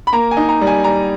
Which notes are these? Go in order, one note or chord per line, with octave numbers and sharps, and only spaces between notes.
B5
A#3 A#5
G#5
D#4
A#5
G3
G#5
G3 A#5